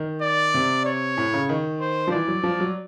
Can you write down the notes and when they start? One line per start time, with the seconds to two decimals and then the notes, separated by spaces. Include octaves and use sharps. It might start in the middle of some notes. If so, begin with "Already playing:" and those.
Already playing: D#3
0.22 D5
0.54 C3
0.86 C#5
1.17 A2
1.34 C#3
1.49 D#3
1.81 C5
2.07 F3
2.12 E3 D5
2.28 F#3
2.43 F3
2.60 F#3